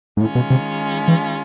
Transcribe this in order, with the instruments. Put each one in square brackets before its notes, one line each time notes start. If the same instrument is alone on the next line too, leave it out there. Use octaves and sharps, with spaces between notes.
[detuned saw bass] G#2
[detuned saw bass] A2 [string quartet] D#3 G#3 C#4 F4
[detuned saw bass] B2
C3
E3